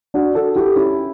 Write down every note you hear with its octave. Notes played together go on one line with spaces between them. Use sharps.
D4 F#4
F#4 A4
E4 G4
C#4 E4